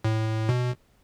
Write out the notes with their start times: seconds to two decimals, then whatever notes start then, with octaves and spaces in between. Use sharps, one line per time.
0.05 A2
0.49 B2